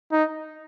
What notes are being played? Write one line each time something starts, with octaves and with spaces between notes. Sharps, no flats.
D#4